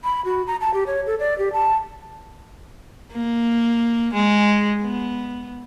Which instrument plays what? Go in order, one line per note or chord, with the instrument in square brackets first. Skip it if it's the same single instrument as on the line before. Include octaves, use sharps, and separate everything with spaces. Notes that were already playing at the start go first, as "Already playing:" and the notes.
[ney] B5
F#4
A#5
A5
G4
C#5
A4
D5
G4
A5
[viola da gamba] A#3
G#3
B3